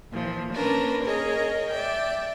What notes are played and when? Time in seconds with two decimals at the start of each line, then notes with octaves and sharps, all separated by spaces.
0.12 A#2 E3 F3
0.52 A#3 C#4 D4 A#4 B4
1.04 G#4 A#4 C#5 D#5
1.71 D5 E5 G5